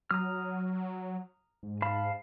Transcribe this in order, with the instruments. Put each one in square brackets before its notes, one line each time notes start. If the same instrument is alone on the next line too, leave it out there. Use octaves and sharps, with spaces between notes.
[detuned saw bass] F#3 [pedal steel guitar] A#5 D#6 F6
[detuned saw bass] G#2
[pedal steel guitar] F5 A5 B5